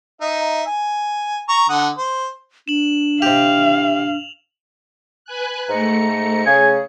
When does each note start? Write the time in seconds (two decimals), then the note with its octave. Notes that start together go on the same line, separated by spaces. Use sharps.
0.21 D#4 E5
0.67 G#5
1.49 A#5 C#6
1.69 D3 F#5 D#6
1.98 C5
2.68 D4 E7 F#7
3.22 C3 G4 F5 F7
5.25 B4 G#5 F#6
5.69 G#2 A3 A#5 C#7
6.46 C#3 G#4 G#5